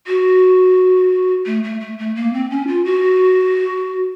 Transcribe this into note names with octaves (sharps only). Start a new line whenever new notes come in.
F#4
A3
A3
A3
A3
A#3
C4
C#4
F4
F#4